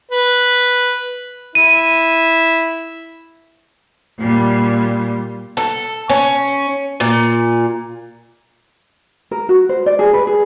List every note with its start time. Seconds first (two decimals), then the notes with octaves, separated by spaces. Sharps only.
0.11 B4
1.55 E4 D#7
4.19 A#2 G3
5.57 A4
6.10 C#4
7.00 A#2
9.31 A#4
9.49 F#4
9.69 C5
9.86 D5
9.99 G#4
10.13 B4
10.27 G#4